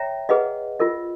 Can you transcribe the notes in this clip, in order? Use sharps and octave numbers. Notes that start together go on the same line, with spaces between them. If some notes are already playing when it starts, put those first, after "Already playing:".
Already playing: C#5 E5 G5 A#5
G#4 B4 D#5 F#5
F4 A#4 D#5